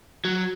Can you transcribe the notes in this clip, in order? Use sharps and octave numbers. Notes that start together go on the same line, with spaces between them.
F#3